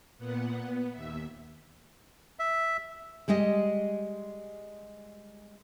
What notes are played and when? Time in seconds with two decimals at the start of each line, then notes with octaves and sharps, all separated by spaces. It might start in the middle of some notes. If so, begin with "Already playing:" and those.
0.18 A#2 B3 F#5
0.60 B3
0.92 D#2 E5
2.39 E5
3.28 G3 G#3 G4 D#5